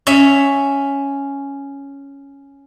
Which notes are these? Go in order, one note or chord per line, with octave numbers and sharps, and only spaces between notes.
C#4 E5